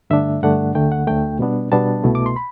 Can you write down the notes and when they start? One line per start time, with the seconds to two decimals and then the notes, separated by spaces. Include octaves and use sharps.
0.10 G2 D3 A3 D4 E5
0.43 G2 D3 A3 D4 F#5
0.75 D2 D3 A3 G5
0.92 F#5
1.07 D2 D3 A3 G5
1.39 B2 G3 B3 D4
1.72 B2 G3 B3 D4 A5
2.04 C2 B2 A3 E4
2.15 D6
2.26 C6
2.36 B5